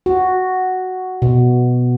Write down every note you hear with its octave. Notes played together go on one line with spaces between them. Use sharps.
F#4
B2